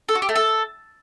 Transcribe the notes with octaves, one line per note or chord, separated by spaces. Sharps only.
A4
F#4
G4
A3
A4